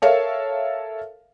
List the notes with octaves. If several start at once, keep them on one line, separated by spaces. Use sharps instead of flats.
A4 A#4 C#5 E5 F5